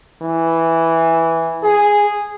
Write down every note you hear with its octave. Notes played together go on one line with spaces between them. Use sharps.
E3
G#4